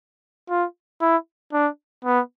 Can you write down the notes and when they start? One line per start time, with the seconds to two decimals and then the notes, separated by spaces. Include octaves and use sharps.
0.50 F4
1.01 E4
1.53 D4
2.05 B3